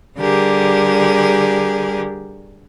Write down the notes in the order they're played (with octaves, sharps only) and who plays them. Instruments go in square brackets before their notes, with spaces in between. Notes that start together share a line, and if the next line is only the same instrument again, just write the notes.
[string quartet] D3 G3 G4 G#4 A#4